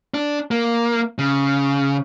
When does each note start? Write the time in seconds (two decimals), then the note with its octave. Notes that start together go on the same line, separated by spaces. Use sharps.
0.14 D4
0.51 A#3
1.19 C#3